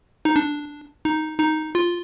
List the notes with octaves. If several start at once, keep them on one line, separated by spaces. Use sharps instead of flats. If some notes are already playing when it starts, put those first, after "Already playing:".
D#4
D4
D#4
D#4
F4